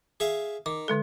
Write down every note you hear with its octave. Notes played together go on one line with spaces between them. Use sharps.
G#4 E5 F5
D#3 D6
D3 G#3 A4